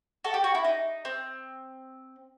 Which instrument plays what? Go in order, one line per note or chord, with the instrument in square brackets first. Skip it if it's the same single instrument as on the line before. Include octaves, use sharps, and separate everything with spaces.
[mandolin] F#4 A4
G4
F#4
E4
D#4
C4